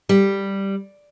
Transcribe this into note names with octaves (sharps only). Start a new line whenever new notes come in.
G3